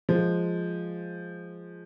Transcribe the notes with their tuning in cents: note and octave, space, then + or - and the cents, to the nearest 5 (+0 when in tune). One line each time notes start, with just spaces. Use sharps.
F3 +0 G#3 +0